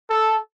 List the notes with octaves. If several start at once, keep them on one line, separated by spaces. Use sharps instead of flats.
A4